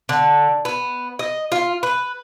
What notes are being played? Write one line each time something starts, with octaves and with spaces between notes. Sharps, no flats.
D3
B3
D#5
F4
B4